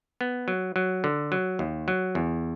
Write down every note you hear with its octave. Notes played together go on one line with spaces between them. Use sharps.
B3
F#3
F#3
D3
F#3
D#2
F#3
E2